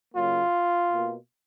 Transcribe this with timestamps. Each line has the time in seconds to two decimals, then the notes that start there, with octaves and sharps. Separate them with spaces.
0.14 C#3 F#3 A#3 F4
0.89 B2 A#3